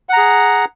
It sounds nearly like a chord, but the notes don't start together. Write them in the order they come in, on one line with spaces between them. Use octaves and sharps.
F#5 A#5 G#4